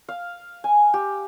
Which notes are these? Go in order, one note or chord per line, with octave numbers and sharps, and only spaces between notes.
F5
G#5
G4